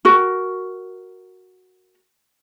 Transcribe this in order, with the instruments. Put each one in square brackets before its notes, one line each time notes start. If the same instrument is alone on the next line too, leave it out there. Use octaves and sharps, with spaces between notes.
[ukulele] F#4 A#4